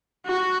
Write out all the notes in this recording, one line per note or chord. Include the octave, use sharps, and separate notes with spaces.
F#4